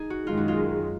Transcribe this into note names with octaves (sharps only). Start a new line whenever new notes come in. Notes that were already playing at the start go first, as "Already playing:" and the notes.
Already playing: D#4 G#4
F#4
F#2 D#3 G#3 F4
F#4
F4